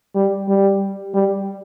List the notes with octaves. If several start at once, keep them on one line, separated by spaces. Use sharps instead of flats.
G3
G3
G3